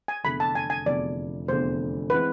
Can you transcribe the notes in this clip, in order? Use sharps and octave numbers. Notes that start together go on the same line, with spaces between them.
G#5
F1 E2 D3 B5
A5
G#5
G#5
F1 E2 D3 D5
F1 E2 D3 C5
E3 G#3 C4 B4